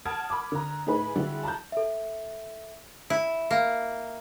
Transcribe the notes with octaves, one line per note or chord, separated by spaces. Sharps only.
F#5 A5 D#6 F6 G#6 D7
B5 D6
D3 A#5
A2 D#4 G#4 B4 B5
D3 G3 E4 F#4 G#4
A5 A#5 F#6 G6
A4 E5
E4
A#3